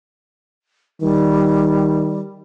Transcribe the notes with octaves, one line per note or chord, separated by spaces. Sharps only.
D#3 G3